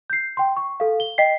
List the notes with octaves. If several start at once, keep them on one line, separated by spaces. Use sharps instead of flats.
G6 C7
G5 C6
C#6
A4 F5
G7
D#5 G5 B6 C7